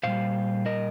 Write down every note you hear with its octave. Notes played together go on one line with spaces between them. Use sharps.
A#2 G3 C5 F5
A#4 D#5